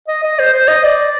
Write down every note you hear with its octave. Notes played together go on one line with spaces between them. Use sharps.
D#5
D#5
C5
C5
D#5
D5